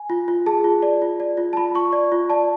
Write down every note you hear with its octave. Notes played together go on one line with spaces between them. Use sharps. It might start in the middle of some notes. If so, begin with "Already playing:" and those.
Already playing: G#5
F4
F4
G#4 A5
F4
D5
F4
D5
F4
A5
F4 B5
F4 C#6
D5
F4
D5 A5